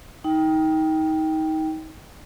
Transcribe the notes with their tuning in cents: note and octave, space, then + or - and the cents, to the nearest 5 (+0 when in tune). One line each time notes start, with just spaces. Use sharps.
D#4 +25 G5 +0